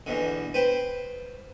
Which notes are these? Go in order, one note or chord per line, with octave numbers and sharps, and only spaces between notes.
E2 B2 D3
B4 C5 G5